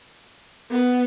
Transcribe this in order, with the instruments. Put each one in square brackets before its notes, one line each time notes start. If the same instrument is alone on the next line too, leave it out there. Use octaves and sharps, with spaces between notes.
[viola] B3